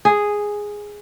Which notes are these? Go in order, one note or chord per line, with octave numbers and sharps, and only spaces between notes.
G#4